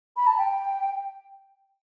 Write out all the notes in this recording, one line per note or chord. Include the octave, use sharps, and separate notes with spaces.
B5
A5
G5